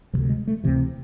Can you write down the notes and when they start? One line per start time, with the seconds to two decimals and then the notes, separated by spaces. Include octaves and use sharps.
0.13 D2 C3 F3
0.30 G#3
0.47 A3
0.64 D2 C3 E3